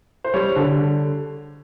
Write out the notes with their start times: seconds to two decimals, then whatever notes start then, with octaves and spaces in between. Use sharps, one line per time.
0.24 C5
0.33 G3 C#5
0.56 D3